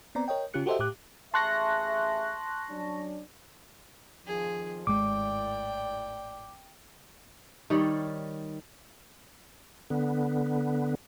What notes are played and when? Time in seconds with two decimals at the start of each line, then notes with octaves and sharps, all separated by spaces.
0.15 B3 C4 D5 A#5
0.28 A#4 C#5 D#5 G5
0.54 C#3 C#4 F4 G4 F#6 C#7
0.66 F#4 G4 A4 C5 D#5 E5
0.79 A2 G4 D6 F#6
1.34 A1 G#4 E5 A5 C6 C#6 F#6 A#6
2.69 F#3 C#4 D4
4.27 F2 D#3 F3 G#4
4.87 G#1 A2 G#3 D5 G5 D6
7.70 D#3 G3 C#5 D5
9.90 D3 B3